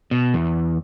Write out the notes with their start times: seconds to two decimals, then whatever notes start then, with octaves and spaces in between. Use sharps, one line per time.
0.11 B2
0.34 E2